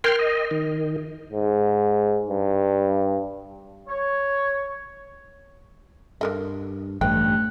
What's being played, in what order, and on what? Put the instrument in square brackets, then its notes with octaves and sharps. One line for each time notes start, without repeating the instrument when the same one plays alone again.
[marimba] A#4 G#6 [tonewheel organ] G5 C6 F6
[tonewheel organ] D#5
D#3
[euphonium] G#2
G2
[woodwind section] C#5
[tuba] G2 [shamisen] D3 A#4 D#5
[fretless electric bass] A1 G2 [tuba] A3 [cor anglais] F#5 [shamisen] G5